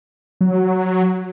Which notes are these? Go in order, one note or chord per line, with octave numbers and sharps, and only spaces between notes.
F#3